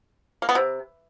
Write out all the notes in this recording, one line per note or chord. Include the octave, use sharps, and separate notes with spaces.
A#3
B3
C3